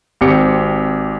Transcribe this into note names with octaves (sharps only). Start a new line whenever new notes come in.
G#1 C4 G4 C#7